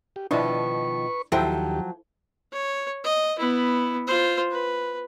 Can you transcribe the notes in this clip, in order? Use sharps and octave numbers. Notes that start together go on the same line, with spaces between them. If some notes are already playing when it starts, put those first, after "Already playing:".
G4
B2 D#3 F3 D4 E4 B4 C#6
D#2 F3 F#3 E4 G4 A4 C5 G5
C#5
D#5
B3 E4
F4 C5
B4